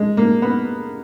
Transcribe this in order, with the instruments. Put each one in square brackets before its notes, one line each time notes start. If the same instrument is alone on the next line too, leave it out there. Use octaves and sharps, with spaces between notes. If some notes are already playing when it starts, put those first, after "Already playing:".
Already playing: [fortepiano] G#3
A#3
B3